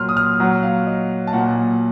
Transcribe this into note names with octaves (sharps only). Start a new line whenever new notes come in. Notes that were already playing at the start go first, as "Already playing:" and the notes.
Already playing: A#2 F#3 C6 F6
D#6
F6
A#2 F#3 F#5
F5
D#5
A5
A#2 F#3 F#5